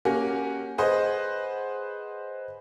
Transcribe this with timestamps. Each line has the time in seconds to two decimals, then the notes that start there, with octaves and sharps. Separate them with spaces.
0.05 A#3 C#4 F#4 G4
0.78 G#4 B4 C5 D#5 F#5